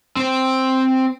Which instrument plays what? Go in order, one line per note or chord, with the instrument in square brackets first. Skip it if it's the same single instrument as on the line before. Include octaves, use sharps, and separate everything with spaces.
[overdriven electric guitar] C4 C5